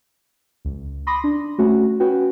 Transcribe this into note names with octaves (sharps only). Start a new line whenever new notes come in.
C#2
B5 C6 D6 D#6 A#6
D4
A3 C#4 F#4
C#4 F#4 B4 G5